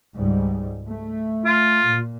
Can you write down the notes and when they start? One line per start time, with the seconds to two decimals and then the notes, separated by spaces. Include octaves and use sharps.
0.17 C#2 G#2 G3
0.88 A3
1.45 F4
1.86 A#2